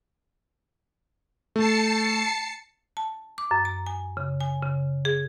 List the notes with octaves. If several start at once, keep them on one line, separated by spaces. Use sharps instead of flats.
A3 A5 C7 C#7
A5
D6
F#2
A#5
G#5
C#3
G#5
C#3
G#4